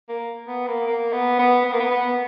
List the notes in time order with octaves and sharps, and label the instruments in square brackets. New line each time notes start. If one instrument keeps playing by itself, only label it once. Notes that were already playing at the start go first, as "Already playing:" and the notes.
[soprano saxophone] A#3
B3
A#3
A#3
B3
B3
B3
A#3
B3
B3